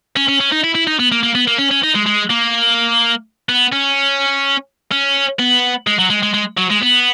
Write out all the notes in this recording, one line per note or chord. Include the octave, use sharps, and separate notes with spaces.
C#4
C#4
C#4
D#4
E4
E4
D#4
B3
A#3
A#3
B3
A#3
C#4
C#4
D#4
G#3
G#3
A#3
B3
C#4
C#4
B3
G#3
F#3
G#3
G#3
G#3
F#3
G#3
B3